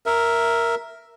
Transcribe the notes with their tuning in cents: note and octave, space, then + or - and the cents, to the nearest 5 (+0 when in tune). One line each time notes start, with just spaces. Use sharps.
A#4 +0 E5 +0